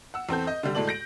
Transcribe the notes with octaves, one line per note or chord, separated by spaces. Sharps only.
F#5 E6
E2 C4 A4 G6
D#5
D3 G3
D2 A2 G#3 A4 D5 F#7
G6 A#6 D7